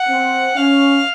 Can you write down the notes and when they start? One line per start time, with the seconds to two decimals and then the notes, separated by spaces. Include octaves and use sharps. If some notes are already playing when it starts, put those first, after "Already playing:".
Already playing: F#5
0.09 C4
0.56 C#4 F5